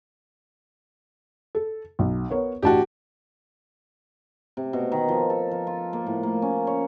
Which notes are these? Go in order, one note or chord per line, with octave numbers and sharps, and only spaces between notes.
A4
B1
B3 A#4 C#5
A1 D4 F#4 G4 A5
C3
B2
D#3
F3
A4
F3
F4
A#3
A2
A#3
C#4
C#5